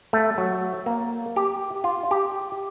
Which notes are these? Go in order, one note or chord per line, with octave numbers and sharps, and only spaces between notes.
A3
F#3
A#3
G4
F4
G4